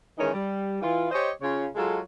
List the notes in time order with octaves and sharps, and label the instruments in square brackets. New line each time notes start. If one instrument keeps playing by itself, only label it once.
[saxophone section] D#3 E3 G#3 C#4 D#4 A#4
G3
E3 F4
G4 C5 C#5 D#5
C#3 F4 C#5
F#3 G#3 F4 A4